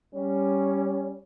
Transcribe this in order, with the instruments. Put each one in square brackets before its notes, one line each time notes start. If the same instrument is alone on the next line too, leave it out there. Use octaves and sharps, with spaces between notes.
[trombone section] G3 C#4